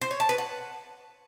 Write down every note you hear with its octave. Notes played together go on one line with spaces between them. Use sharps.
C5
C#5
A5
B4
F#5